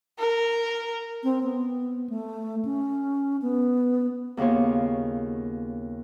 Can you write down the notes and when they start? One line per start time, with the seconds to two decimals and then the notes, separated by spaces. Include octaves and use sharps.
0.19 A#4
1.23 C4
1.43 B3
2.10 A3
2.65 C#4
3.42 B3
4.37 D#2 C#3 B3 F4 C#5